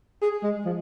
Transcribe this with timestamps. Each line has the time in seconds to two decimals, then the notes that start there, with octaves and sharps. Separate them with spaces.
0.22 G#4
0.43 G#3
0.65 F3